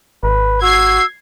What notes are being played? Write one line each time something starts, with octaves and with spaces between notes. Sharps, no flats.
G#1 B4
F#4 E6 G#6 C7